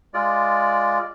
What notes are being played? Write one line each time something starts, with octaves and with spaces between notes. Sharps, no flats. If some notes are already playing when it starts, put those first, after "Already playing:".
G#3 F4 D5